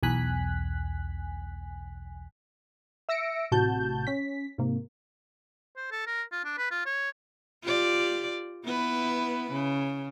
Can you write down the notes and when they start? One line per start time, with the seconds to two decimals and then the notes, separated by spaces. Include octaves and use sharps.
0.03 B1 E2 G#5 F#6 B6
3.09 E5 E6 A#6 C#7 D7
3.51 A1 A2 C3 F#4 A5 G6
4.07 C#4 B6
4.58 G#2 C3 A#3
5.77 C5
5.92 A4
6.07 A#4
6.32 F4
6.45 D4
6.58 B4
6.71 F4
6.86 C#5
7.63 F4 G4 D5
8.65 B3 E4 B4
9.52 C#3